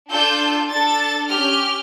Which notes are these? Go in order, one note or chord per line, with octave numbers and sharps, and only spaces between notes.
D4 F4 A4 G6
D4 A4 A6
C#4 G4 F6